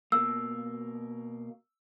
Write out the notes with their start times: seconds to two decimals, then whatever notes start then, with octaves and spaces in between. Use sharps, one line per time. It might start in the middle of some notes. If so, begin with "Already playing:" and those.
0.12 B2 A#3 E6